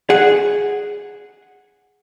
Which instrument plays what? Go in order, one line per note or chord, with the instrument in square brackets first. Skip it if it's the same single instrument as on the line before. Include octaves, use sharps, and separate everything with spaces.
[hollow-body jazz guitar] G#4 F#5